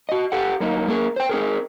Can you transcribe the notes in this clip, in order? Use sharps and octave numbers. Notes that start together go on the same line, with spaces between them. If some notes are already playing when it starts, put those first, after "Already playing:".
F#4 D#5
G4 A4 F#5
F#2 A#3 D#4
A3 A#3 G#4 A#4
C5 G5
C4 G#4 A#4